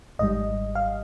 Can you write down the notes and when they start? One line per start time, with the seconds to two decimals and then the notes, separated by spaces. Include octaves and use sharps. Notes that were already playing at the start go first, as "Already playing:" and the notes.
0.19 G#1 G#2 G3 D#5
0.75 F5